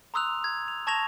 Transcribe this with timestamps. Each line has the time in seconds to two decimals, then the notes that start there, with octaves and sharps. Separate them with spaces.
0.14 A#5 C6 D#6 E6 F#6 F7
0.44 G#6
0.68 F7
0.87 A5 C#6 G#6 A#6 E7 F7